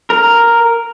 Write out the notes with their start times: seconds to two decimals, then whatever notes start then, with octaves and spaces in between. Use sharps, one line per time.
0.10 A#4